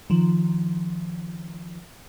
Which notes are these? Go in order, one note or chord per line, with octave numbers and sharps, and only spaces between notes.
D#3 F3